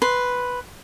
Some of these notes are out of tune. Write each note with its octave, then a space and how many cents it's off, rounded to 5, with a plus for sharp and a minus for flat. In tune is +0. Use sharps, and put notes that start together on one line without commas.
B4 +0 C6 +0